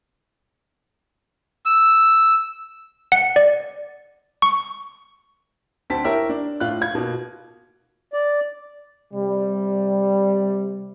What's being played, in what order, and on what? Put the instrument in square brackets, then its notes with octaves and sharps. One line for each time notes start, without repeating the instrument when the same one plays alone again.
[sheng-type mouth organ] E6
[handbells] F#5
D5
C#6
[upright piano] D2 D3 C4 A5 B6
E4 G4 A#4 C#5 E5
D4
A2 F4 F#6
F4 G#6
B2 A#3 F4
[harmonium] D5
[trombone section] C3 G3